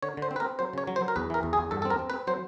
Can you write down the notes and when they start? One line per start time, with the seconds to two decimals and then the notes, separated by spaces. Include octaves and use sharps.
0.03 D3 C#5
0.17 D3 C5
0.31 C4
0.36 B4
0.40 A#4
0.45 C4
0.59 F#3 C5
0.73 C#3 C#5
0.87 F#3
0.96 C5
1.01 F#3
1.08 A#4
1.16 E2 B4
1.30 E3 A#4
1.43 E2
1.53 G#4
1.58 E2
1.71 G2 A4
1.82 A4
1.85 C4
1.90 A#4
1.99 C4
2.10 B4
2.14 C4
2.27 F#3 C5